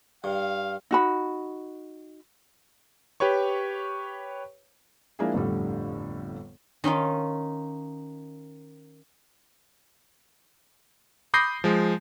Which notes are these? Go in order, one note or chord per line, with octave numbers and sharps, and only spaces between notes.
G2 F5
D#4 F#4 B5
G4 B4 C#5 C#6
F3 G#3 A#3 D4 E4 G#4
G1 F2 A2 D3 G3
D#3 C#4 D#4 F4
B5 D6 D#6 G6 A#6 C7
F3 G#3